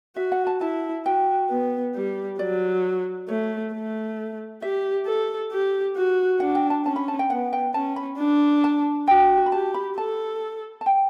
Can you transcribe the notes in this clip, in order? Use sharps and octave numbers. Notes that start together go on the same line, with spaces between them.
F#4 E5
F#5
A5
E4 A5
F#4 G5
B3
G3
F#3 D5
A3 C#5
A3
G4 E5
A4
G4
F#4
D4 F#5
G5
A5
C#4 A5
B5
A5
G5
B3 F#5
G5
C#4 A5
B5
D4
A5
F#4 G5
B5
G4 A5
B5
A4 A5
A5
G5